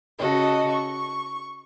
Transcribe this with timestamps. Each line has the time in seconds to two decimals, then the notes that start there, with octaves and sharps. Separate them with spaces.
0.18 C#3 F#4 A4 D#5
0.71 C#6